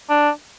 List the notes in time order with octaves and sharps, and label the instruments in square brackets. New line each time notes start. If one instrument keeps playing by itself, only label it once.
[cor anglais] D4